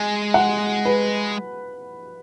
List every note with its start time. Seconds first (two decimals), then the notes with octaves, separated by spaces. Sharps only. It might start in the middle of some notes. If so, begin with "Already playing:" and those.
Already playing: G#3 G#5
0.34 F#5
0.85 B4